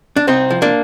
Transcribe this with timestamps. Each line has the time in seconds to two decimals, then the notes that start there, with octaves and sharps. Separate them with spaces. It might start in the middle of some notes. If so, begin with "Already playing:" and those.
0.16 D4
0.27 C2 C4 D#4
0.51 F3
0.62 A#3 D4